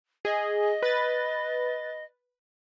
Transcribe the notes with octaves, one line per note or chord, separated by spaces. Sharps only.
G#4 D#5
B4 A6